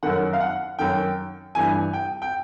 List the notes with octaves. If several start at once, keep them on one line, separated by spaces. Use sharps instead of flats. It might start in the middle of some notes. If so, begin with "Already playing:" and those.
F#2 D#3 F#5
F5
F#5
F#2 D#3 G5
G2 E3 G#5
G5
G5